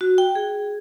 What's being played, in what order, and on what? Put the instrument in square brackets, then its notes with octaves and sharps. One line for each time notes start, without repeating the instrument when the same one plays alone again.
[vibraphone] F#4
G5
G#4